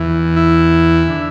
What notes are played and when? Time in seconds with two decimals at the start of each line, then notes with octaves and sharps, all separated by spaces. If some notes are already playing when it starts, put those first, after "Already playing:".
Already playing: E2 E3
0.36 E4
1.09 D3